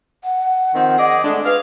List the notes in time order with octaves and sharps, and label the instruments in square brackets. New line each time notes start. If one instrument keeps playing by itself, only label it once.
[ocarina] F#5
[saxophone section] D#3 F3 C4
G#4 D5 D#5
G#3 A3 D4
[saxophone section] G#4 F5 [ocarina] B4